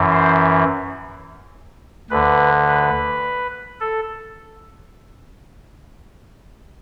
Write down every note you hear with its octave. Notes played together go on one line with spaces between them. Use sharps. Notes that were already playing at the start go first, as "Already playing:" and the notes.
Already playing: F#2 E3
C5
D2 D3 B4
B4
A4